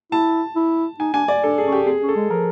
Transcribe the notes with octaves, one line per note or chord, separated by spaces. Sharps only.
E4 A5
E4
D#4 G#5
D4 G#5
D5
D4 A4
G#4
C#4
G4
C4 G#4
C#4
A4
G#3
F3 A#4